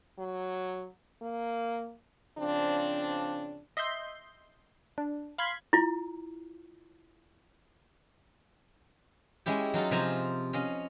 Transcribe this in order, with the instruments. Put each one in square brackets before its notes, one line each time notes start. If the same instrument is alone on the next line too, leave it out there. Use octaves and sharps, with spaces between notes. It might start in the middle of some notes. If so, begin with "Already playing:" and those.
[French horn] F#3
A#3
[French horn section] C#3 F3 C4 D4
[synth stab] D#5 E5 C6 G6
D4
F5 B5 C6 G#6
[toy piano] E4 F4
[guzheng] G#3 C#4 E4 G4
F#3 D#4 F4 A4
C3 F3 F4 C5 G#5 A#5
C#4 D#5 F5